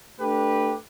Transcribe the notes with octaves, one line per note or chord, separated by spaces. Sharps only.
A3 D4 G4 B4